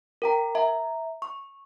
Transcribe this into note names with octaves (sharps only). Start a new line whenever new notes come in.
A#4 G5 A#5
E5 A#5
C#6